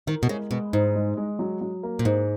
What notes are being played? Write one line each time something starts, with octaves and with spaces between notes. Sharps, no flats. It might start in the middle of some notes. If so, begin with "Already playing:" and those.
D#3 A#4
B2
C#3 G#3
B2 G#3
G#2 D#4
G#3
G#3
F#3
F#3
A#3
A#2
G#2 D#4